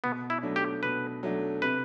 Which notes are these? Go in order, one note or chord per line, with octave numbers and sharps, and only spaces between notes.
B2 B3
E4
F#3 A3 D4
G4
B2 B4
F#3 A3 D4
C3 B4